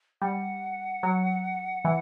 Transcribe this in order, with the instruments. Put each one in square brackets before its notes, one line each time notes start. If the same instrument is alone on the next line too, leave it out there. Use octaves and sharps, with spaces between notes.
[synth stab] G3 [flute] F#5
[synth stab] F#3
E3